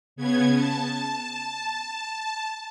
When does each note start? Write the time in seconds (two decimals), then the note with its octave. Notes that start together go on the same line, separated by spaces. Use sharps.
0.16 C#3 B3 G#6
0.54 A5